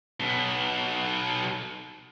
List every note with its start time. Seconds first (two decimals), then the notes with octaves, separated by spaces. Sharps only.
0.20 B1 B2